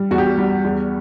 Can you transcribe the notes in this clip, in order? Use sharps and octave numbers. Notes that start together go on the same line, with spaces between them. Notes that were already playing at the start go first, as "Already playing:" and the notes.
Already playing: G3
E2 F#4
G4
F#4
G3
E2